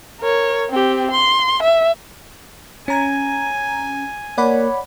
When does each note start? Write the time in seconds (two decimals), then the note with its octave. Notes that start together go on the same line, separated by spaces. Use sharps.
0.21 A#4 C#5
0.70 C4 G4
1.11 C6
1.63 E5
2.88 C#4 G#5 A#5 G#6
4.38 A#3 C#5 D5 F#5 B5